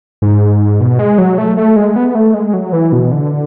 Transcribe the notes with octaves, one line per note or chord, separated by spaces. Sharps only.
G#2
B2
G#3
F#3
A3
A3
G#3
B3
A3
G#3
F#3
E3
B2
D3